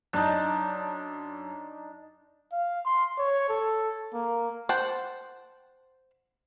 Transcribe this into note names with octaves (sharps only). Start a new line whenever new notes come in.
F#2 D4 D#4 A5
F5
C6
C#5
A4
A#3
C5 F#5 G5 A5